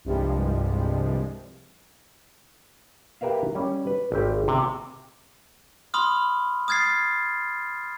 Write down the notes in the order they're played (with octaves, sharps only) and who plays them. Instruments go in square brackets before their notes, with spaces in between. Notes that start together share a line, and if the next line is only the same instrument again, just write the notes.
[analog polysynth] C2 G2 C3 F3 G3 G#3
[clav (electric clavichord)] G4 A#4 B4 E5 F5
G3 C#4
B4
G#1 G4
C3
[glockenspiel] B5 C6 D#6 F6
D#6 F6 G#6 A6 C7